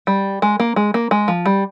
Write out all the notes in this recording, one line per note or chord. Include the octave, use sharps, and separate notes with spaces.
G3
G#3
A#3
G#3
A#3
G#3
F3
G3